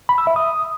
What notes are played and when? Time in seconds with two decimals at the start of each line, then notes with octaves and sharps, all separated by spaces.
0.09 B5
0.18 E6
0.27 E5
0.36 D#6